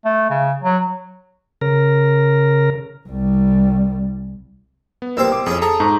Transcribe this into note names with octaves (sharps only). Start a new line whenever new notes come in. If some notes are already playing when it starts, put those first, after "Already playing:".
A3
C#3
F#3
C#3 A#4
C2 G3
B3
C2 A#3 C4 C5 E6
D6
F2 C#4 E4 G#4
G#4 A4 A#5
G#2 A#5 C#6